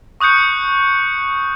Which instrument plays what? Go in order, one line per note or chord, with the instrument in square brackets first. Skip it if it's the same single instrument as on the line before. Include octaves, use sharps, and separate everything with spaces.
[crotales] C#6 D#6 F#6 G6 C#7